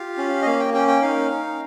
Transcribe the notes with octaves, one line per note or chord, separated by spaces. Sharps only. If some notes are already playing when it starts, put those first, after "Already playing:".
Already playing: F4 G4 F5
C#4
D#5
A#3 F5
G5
C#4 G5
G5
D#4 F5
D#4